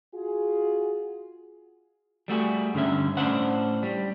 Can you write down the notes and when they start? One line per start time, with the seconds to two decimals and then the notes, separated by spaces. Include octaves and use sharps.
0.13 F4 F#4 G#4
2.28 G3 A3 F#4 G#4
2.74 G2 D3 F#3 C#4 E5
3.17 A2 C#4 D4 C5 F#5
3.83 G3